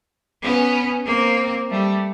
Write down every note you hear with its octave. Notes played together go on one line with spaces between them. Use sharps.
B3 C#4
A#3 C4
G3 A3